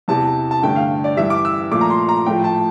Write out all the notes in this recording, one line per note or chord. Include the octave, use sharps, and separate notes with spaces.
E2 C3 E3 A5
A5
G2 D3 A3 G5
F5
D5
G2 E3 G3 E5
D6
E6
A#2 F3 A3 D6
A#5
C6
A#5
A2 F3 A3 G5
A5